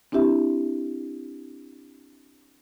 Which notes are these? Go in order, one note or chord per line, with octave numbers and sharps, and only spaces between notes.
C4 D4 E4 G4 E5